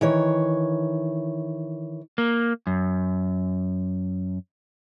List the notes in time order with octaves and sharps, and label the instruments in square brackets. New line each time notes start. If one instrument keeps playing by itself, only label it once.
[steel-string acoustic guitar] D#3 E3 C#5
[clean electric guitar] A#3
F#2